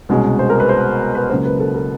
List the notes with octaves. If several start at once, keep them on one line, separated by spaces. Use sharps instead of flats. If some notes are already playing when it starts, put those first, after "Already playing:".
C2 B2 G#3 C#4
C5
A#4
B4
C5
B4
C#2 C#3 F#3 A#3 C5
B4
A4
A#4